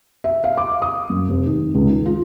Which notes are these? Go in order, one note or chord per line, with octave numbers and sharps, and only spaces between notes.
E5
F5
D6
D#6
F#2
F1
D#3
C#2
D#3
F4